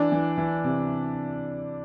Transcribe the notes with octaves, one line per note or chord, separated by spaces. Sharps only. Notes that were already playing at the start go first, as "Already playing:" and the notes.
Already playing: E3 D4
E3
E3
C3